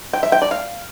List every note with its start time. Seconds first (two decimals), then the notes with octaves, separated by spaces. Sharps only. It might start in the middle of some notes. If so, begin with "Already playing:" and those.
0.13 G5
0.23 E5
0.32 G5
0.42 D5
0.51 F5